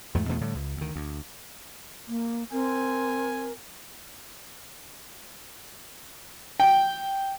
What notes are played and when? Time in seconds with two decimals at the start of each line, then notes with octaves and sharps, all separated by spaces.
0.15 E2 G#2 A3
0.29 E2 B2 A3 B3
0.41 A2 D3 G3
0.55 C#2
0.77 D2 D#3
0.96 D2
2.08 A#3
2.52 C4 A#4 G#5
6.60 G5